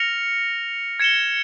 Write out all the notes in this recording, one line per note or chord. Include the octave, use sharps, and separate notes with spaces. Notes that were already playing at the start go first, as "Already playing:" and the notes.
Already playing: F6 A#6 C#7 F7
G#6 C#7 E7 G7